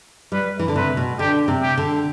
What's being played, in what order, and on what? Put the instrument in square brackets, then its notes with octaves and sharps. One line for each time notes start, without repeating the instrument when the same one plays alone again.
[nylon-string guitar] G3 [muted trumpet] B4
[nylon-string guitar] E3
D3
[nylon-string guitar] C3 [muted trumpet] B4
[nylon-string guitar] B2
[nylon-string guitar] D3 [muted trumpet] G4
[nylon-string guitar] C3
[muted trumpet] G4
[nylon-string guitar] D3